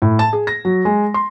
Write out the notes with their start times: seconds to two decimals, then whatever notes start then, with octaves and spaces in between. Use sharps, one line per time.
0.02 A2
0.19 A5
0.33 G#4
0.47 A#6
0.65 F#3
0.85 G#3
1.14 C6